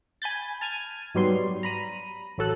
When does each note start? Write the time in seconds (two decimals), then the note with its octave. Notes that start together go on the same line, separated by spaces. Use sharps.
0.22 G#5 B5 G6 A6
0.61 A5 F6 G#6 D#7
1.15 G#2 F#3 G3 B3 C6
1.63 A#5 B5 D#7
2.38 A1 F#3 A4 F#6